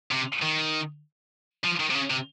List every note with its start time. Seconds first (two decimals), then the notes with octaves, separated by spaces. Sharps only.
0.12 C3
0.42 D#3
1.64 F3
1.80 D#3
1.90 C3
1.95 C#3
2.10 C3